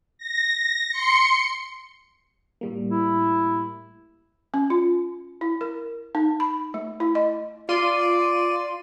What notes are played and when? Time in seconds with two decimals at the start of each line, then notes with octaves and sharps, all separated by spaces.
0.18 A#6
0.90 C6 C#7
2.61 A2 G3 A#3
2.90 E4
4.54 C#4
4.70 F4
5.41 E4
5.61 A#4
6.15 D#4
6.40 B5
6.74 A3
7.00 E4
7.15 D#5
7.69 F4 D5 C6 D#7